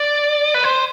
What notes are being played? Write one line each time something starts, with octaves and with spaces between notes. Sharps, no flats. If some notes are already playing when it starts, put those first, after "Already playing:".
Already playing: D5
B4
C5